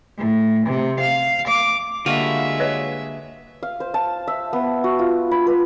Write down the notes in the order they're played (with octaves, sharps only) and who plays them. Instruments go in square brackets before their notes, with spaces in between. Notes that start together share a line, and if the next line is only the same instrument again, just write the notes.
[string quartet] A2
C3
F5
D6
[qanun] D3 G3 A#3 [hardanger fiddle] G#3 E5 [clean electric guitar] F4 F#4
[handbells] B4 C#5 D#5
[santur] F5
C5
A5
E5
B3
F#4
F4
B5
B4